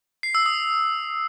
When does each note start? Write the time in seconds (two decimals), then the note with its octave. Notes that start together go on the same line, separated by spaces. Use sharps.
0.23 C7
0.35 E6
0.46 D#6